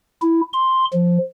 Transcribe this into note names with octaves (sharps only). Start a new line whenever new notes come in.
E4
C6
F3